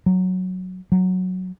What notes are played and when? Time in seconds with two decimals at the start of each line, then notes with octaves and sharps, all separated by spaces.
0.06 F#3
0.92 F#3